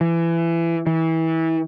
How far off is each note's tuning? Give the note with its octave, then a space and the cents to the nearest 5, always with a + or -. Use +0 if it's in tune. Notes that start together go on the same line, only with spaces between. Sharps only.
E3 +25
E3 -25